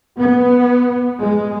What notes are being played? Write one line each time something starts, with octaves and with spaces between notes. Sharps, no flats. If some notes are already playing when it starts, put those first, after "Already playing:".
B3
G#3